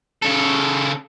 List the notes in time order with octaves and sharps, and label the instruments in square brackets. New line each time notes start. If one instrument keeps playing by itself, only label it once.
[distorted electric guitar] C#3 A4